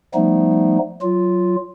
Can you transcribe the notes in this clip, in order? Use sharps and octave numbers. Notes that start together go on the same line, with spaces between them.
F3 G3 A3 B3 D#4
F#3 F4